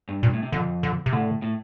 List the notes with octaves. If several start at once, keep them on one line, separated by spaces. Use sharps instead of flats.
G2
G2 A#2
A2
C3
F2 D3
D3
C3
A2 D3
A2